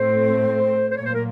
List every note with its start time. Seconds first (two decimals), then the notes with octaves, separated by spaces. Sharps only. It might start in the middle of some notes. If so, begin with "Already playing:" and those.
Already playing: A2 A3 C4 C5
0.90 C5
0.96 A#2 F#3 A#3 C#5
1.05 C5
1.14 A#4